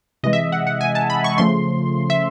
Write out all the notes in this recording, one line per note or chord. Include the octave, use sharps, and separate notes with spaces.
C3 E3 G#3 D#5
E5
F#5
F#5
G#5
A5
B5
C#6
C#3 F3 A3 C6
E5